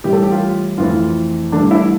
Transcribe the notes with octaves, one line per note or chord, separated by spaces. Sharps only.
A2 E3 G3 G4
A4
G4
F4
F2 E3 A3 F4
G2 E3 A3 D4
E4